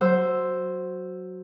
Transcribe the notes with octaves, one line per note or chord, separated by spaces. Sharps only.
F#3 C5 E6